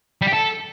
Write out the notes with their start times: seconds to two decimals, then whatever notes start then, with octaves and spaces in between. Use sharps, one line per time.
0.21 G3
0.27 G4
0.33 A4